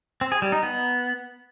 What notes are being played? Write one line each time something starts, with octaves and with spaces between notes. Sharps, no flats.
C4
G#4
G3
D#4
B3